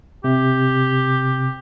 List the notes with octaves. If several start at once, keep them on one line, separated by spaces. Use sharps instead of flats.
C3 G4